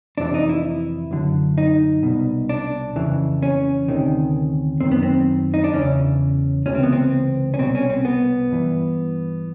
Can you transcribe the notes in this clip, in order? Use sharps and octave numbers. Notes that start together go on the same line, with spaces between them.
F2 C3 E3 D4
D#4
E4
F#2 D3
D#4
C2 B2
D4
F2 C#3 E3
C#4
D2 C3 D#3
F#2 D#3 C4
B3
C4
D#4
D4
E2 C#3 E3 C#4
C#2 C3 E3 C#4
C4
B3
C4
C#4
C2 B2 C4
C#4
C4
B3
G2 E3